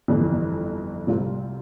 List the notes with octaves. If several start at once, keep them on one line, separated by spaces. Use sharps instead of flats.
G1 F2 E3
C2 C3 G3 C4 F4